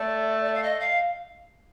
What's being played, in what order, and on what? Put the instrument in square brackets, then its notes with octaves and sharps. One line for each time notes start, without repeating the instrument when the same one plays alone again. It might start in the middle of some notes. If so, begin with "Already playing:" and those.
Already playing: [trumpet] A3 [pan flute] D5
[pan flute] D5
F5
D#5
F5